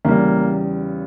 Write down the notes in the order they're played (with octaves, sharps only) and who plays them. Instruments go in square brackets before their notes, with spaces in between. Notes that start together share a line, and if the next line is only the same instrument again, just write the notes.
[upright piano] E2 C#3 G3 A#3